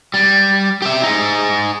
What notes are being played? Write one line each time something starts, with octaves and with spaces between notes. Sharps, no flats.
G3
G4 E5
D#4 G#4